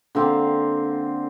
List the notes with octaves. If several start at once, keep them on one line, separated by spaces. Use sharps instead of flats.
D3 A#3 C4